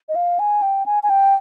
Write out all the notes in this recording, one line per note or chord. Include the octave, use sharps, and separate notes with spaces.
D#5
F5
G#5
G5
G#5
G#5
G5